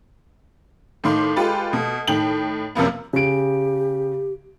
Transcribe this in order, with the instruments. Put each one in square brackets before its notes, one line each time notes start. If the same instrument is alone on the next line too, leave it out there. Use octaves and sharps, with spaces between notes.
[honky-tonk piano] A2 D#3 F5 C6 D6
G#3 F4 G4 A4 B4
B2 A3
A2 D#3 G5 F#7
F#2 C3 F3 A#3 B3
[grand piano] C#3 D7 [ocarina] G4